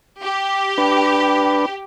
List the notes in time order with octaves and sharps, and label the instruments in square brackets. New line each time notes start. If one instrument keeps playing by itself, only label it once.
[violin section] G4
[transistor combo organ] D4 B4